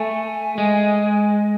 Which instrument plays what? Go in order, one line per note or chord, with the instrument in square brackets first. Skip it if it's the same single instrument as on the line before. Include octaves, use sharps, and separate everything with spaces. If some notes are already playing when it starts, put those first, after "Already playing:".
Already playing: [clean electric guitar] A3 [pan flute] G#5
[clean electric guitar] G#3